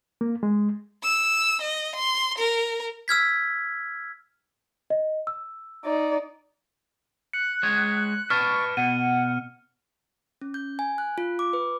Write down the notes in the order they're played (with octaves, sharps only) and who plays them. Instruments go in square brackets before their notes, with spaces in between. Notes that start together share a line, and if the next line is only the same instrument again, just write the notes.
[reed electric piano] A#3
G#3
[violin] E6
D#5
C6
A#4
[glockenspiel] E6 F6 G#6 B6
[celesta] D#5
E6
[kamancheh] D#4 D5
[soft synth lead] F#6 [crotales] C#7
[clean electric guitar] G#3 C#5
[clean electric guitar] B4 D5 A5 [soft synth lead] C#6 [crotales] F6
[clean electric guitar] B2 [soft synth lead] F#5 [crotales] D#7
[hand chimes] C#4
G6
G#5
F#6
F4
D6
B4